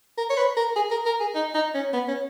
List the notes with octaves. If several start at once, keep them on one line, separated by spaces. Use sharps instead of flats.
A#4
C#5
B4
A#4
G#4
A#4
A#4
G#4
D#4
D#4
C#4
B3
C#4